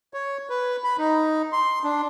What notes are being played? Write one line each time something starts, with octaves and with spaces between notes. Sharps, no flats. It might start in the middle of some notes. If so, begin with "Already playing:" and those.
C#5
B4
B5
D#4
C6
D4